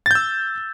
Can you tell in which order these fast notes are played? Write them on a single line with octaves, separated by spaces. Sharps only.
A6 G6 E6